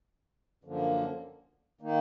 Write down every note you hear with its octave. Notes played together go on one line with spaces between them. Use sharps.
F#2 D3 F3 A#3
D#3 A#3 D#4